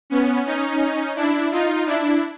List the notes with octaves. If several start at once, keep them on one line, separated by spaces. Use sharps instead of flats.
B3 C#4
C#4 D#4
D4 E4
D#4 F4
D4 E4